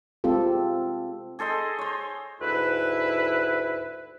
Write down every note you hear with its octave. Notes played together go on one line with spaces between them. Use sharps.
G#3 C4 F4 G4 A4
G#4 A4 C5 D#5
C5 C#5
D2 G#2 E4 B4